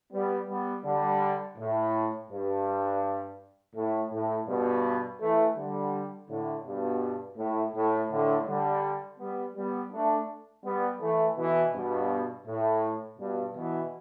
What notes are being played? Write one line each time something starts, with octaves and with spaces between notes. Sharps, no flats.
G3 B3
G3 B3
D3 G3
A2
G2
A2
A2
G2 B2
E3 A3
D3 G3
A2 D3
G2 B2
A2
A2
A2 D3
D3 G3
G3 B3
G3 B3
A3 D4
G3 B3
E3 A3
B2 E3
G2 B2
A2
G2 B2
B2 E3